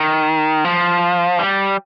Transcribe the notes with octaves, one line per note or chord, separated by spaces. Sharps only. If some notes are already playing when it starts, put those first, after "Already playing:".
Already playing: D#3
F3
G3